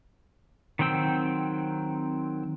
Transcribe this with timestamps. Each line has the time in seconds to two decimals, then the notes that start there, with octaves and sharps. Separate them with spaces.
0.79 D#3 F#3 C4 G5 E6